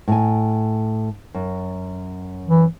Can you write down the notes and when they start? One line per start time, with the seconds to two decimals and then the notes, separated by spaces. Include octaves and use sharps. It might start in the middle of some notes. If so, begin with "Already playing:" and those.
0.08 A2 G#5
1.34 F#2
2.48 E3